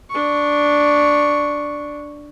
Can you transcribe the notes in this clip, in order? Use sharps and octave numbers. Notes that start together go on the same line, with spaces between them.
D4 C#6